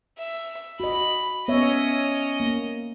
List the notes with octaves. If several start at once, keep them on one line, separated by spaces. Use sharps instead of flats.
E5
F#4 D#5 B5
B3 C#4 C#5 D#5 E5
A#3